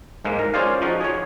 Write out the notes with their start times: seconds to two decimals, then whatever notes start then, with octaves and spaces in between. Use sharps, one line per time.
0.25 G#2 G#3 A#3
0.39 A#4
0.54 C#4 F4 G#4 C5 D5 F5
0.82 F3 D#4 F#4
1.01 G#4 C#5